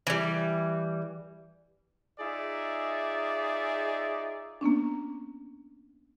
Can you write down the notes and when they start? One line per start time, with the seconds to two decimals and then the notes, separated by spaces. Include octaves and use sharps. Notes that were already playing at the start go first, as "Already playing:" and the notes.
0.07 E3 G3
2.19 D#4 F4 G#4 D5 E5
4.61 A#3 B3 C#4 D4